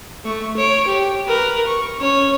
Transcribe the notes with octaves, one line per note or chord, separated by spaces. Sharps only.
A3 C#6
C#5 D7
G4
A#4 B4
C#6
C#4 C#5